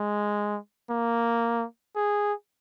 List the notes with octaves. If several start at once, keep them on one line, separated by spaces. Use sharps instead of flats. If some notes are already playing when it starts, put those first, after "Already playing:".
Already playing: G#3
A#3
G#4